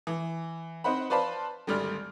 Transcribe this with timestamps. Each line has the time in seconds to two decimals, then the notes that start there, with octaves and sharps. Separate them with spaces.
0.07 E3
0.84 C4 D#4 C5 F#5 B5
1.10 B4 C5 D5 F5 A5 B5
1.67 G#1 D2 G3 D5 F6